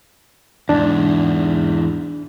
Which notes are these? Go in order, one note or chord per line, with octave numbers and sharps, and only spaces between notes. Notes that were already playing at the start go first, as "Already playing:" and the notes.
E2 G#2 D4